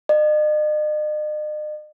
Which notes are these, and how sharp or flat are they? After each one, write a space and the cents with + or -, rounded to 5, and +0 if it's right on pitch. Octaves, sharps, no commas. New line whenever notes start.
D#5 -45